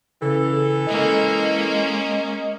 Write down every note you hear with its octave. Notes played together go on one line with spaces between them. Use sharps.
C#3 E3 A4
G#3 A#3 C#4 D#5